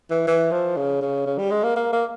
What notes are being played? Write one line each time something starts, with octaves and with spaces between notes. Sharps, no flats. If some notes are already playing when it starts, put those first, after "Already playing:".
E3
E3
F3
C#3
C#3
C#3
G3
G#3
A#3
A#3
A#3